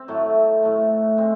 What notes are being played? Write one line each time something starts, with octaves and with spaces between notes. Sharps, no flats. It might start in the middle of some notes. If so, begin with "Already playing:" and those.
Already playing: C4
A2 F#3 A3
A2 F#3 A3
G#3 C4